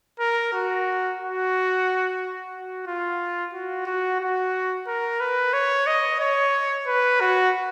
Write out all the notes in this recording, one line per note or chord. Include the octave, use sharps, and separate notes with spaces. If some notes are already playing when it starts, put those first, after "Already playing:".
A#4
F#4
F#4
F#4
F4
F#4
F#4
F#4
A#4
B4
C#5
D#5
C#5
B4
F#4